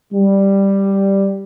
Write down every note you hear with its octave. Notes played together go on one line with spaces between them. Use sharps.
G3